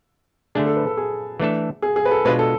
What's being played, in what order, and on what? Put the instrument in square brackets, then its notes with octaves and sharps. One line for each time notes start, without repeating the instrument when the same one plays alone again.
[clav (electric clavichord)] D3 A3 D4 [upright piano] G#4
[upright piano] A4
B4
A4
G#4
[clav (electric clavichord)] E3 A3 D4 A4
[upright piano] G#4
G#4
B4
A4
[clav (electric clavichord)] B2 G#3 D4 F4 [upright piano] B4
[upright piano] A4